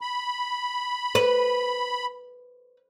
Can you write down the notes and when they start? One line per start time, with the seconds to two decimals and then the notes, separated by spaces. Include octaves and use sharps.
0.01 B5
1.15 B4